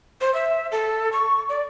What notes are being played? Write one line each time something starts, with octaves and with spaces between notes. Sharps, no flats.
C5
E5
A4
C#6
D5